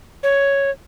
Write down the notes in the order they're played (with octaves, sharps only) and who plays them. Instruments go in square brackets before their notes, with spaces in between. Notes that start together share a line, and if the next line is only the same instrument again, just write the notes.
[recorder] C#5